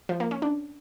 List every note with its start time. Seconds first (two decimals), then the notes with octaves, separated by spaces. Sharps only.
0.09 F3
0.20 A#3
0.31 C#4
0.42 D4